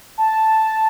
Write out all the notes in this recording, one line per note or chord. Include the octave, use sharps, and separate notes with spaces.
A5